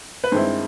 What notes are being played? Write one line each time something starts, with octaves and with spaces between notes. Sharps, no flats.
B4
G2 D#3 G#3 C4 E4 C5